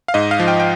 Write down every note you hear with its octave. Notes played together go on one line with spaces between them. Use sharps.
F5
G#2 D#5
F5
F3
G5
G5